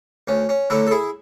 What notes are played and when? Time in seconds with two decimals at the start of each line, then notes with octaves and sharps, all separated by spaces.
0.27 D2 C#4
0.49 C#4
0.70 D3 F#3 A3 C#4 E4
0.87 A4
0.91 E4 G#4